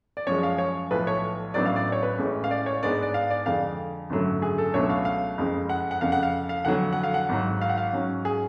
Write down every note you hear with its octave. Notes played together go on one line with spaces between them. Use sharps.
D5
F#2 F3 G#3 C#5
F5
C#5
B1 A2 F3 B4
C#5
A1 A2 F#3 B3 D4 D5
F5
D5
C#5
B4
A1 A2 G#3 C#4
F5
D5
C#5
G#2 G#3 B3 D4 D5
D5
F5
D5
F2 D3 G#3 F5
G#1 F#2 D3 F#3 A3
G#4
A4
C#2 B2 F#3 A3 D4 C#5
F5
F5
F#1 F2 C#3 G#3
F#5
F#5
F1 F2 C#3 F5
F#5
F5
F5
F1 F2 D3 F#3 F#5
F#5
F5
F#5
G#1 G#2 F#3
F5
F#5
F5
G#2 F#3 C#4
G#4